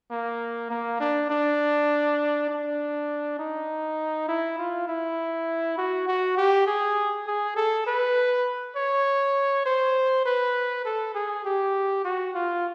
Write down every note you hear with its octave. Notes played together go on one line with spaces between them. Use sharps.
A#3
A#3
D4
D4
D4
D#4
E4
F4
E4
F#4
F#4
G4
G#4
G#4
A4
B4
C#5
C5
B4
A4
G#4
G4
F#4
F4